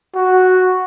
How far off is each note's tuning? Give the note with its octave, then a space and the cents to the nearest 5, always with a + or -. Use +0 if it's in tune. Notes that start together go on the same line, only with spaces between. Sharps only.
F#4 +0